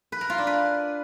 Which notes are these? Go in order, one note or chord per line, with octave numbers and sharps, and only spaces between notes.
B4
A#4
F4
D4
B4